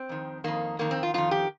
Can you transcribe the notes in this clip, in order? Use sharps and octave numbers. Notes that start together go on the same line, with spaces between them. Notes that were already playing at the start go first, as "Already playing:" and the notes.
Already playing: C4
F2 D#3
F2 D#3 A#3
F2 D#3 A#3
C4
F4
F2 D#3 F4
G4